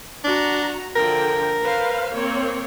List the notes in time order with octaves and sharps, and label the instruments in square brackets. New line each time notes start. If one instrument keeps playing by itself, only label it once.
[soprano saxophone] D4 [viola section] F#4 A#5
[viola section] D3 F3 G5 [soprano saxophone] A#4
[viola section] B4 C5 F5
A#3 C4 C#5